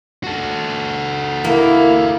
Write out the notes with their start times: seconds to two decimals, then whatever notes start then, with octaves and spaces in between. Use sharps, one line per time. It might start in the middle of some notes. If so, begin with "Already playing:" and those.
0.24 F#4 A4
1.44 A#3 E4